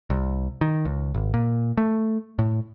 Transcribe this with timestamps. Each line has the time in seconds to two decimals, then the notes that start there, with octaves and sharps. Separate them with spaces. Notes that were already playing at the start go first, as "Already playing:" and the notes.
0.10 C2
0.61 D#3
0.85 C#2
1.15 G#1
1.34 A#2
1.77 A3
2.39 A2